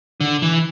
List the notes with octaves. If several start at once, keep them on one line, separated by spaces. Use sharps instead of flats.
D3
E3